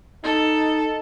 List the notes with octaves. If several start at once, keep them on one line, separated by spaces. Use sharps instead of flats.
D#4 A4